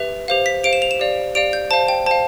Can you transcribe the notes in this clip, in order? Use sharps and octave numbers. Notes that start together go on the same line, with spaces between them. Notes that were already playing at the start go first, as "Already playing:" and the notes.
Already playing: G4 B4 E5
G4 C5 F5
B6
G4 C5 F5 D7
E7
F7
E7
G4 D5 F5
G4 D5 F5 D7
G6
C5 F5 A5
G5
C5 F5 A5